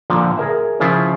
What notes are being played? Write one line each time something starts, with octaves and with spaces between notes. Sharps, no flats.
A#2 D3 F3
G#4 A#4 E5
C#3 F3 E4 F4 C5